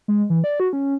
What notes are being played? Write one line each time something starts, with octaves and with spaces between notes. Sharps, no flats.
G#3
E3
D5
F#4
C#4